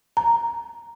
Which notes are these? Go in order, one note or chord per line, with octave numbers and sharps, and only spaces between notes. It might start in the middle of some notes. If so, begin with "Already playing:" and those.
A#5